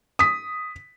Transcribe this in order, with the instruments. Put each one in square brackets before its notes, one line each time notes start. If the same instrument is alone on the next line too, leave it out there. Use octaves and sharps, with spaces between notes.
[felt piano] D#6 B6